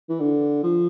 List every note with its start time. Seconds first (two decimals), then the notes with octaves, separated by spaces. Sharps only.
0.10 E3
0.20 D3
0.64 F3